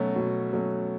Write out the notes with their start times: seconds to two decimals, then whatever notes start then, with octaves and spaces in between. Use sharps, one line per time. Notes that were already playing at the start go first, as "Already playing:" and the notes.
Already playing: B2 F#3 A3 C#4
0.16 B2
0.53 F#3 A3 C#4